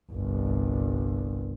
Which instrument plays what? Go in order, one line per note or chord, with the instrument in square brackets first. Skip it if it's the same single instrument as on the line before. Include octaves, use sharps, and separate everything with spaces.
[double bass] G1 C2